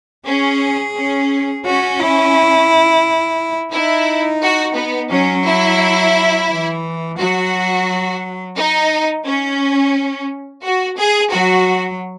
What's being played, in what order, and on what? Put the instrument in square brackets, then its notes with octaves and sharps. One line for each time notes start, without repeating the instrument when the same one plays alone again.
[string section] C#4 [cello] G#4
[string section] C#4
[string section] C#4 [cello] F#4
[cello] E4
[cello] D#4 [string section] E4
[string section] F#4
B3
[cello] F#3 [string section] C#4
[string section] E4
[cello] E3
[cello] F#3 [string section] F#4
[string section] D#4
C#4
F#4
G#4
[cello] F#3 [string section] F#4